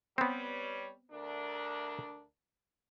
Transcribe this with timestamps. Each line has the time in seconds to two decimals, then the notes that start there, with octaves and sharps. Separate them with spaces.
0.18 G3 B3 C4 B4 C#5
1.12 D2 D4 A#4